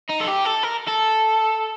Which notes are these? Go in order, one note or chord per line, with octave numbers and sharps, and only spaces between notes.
D#4
A4
G4
A4
A#4
A4